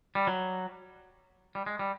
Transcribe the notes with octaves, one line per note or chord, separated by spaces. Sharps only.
G3
F#3
G3
G#3
G3